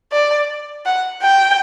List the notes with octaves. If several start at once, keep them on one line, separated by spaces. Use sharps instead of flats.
D5
F#5
G5